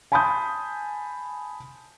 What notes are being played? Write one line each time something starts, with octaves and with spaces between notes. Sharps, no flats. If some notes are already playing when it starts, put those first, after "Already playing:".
G#5 A5 B5 C6 D#6 G6